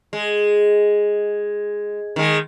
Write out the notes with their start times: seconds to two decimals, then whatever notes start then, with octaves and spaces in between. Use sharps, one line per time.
0.13 G#3
2.16 D#3 G#3